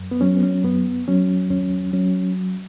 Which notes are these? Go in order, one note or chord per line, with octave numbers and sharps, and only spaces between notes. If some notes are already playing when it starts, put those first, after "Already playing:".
Already playing: F#2
B3
F#3 C#4
B3
C#4
F#2 B3
F#3 C#4
D#2 C#4
F#3 C#4